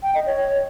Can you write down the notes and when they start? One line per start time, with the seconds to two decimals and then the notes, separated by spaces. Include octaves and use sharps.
0.03 G5
0.15 D#5
0.26 C#5